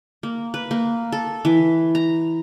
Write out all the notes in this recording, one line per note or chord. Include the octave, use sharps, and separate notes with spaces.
A#3
B4
A#3
A4
E3
A#5